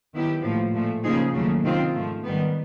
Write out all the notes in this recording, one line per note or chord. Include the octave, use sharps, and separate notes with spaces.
D#3 F#3 B3 E4 G4
A2 F3 A#3
A#2 F3 A3
C#3 F3 A#3 D#4 G#4
D#2 C#3 F#3 A3 C#4
C3 D#3 G#3 C4 F4
G#2 F3 A3
G#2 D#3 G3 B3